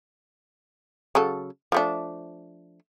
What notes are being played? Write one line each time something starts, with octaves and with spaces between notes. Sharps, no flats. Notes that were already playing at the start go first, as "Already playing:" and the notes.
C#3 F#3 A4
F3 A3 D4